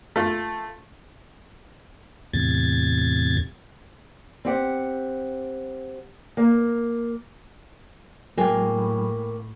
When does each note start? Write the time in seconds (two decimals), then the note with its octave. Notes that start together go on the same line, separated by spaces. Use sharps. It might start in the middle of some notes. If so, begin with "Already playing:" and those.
0.16 A3 F4
2.34 E2 A2 C3 G#6 A6
4.45 C4 G4 F#5
6.37 A#3
8.37 A2 F#3 G#3 A#3 G5 G#5